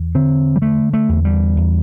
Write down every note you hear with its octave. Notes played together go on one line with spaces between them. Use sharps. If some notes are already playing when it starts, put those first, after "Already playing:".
Already playing: E2
D3 C4
G3
D3 A3
A3
E2
G3
E2